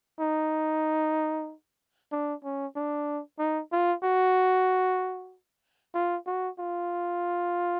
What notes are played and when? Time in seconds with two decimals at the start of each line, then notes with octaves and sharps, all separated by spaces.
0.20 D#4
2.12 D4
2.44 C#4
2.76 D4
3.39 D#4
3.72 F4
4.03 F#4
5.95 F4
6.27 F#4
6.59 F4